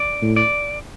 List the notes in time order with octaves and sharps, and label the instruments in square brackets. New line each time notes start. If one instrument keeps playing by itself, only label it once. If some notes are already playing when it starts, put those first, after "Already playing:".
Already playing: [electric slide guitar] D5
[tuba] A2
[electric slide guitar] D5